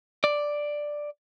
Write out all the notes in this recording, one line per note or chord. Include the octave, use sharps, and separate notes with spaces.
D5